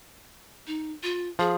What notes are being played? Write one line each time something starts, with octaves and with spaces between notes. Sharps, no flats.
D#4
F4
F3 G#4